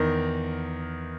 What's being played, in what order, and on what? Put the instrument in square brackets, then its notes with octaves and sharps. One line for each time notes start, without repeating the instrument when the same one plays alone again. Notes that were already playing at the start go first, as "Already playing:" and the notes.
Already playing: [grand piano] E2 D#3 A#4